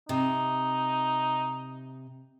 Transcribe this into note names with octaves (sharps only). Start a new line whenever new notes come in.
C3 D#4